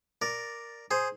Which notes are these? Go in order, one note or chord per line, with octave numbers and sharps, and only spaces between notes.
A#4 D5
G#4 C5